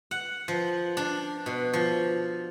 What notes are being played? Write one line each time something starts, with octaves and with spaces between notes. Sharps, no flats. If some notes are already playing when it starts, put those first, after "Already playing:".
F#5
F3
D4
B2
F3